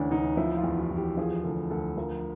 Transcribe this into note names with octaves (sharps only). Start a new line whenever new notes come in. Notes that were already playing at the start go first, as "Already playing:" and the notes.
Already playing: D2 E3 C#4 D4
D2 D#4
F3 E4
F4
E2
F#4
E2
G4
F3 G#4
D2 A4
D2 A4
F3 A#4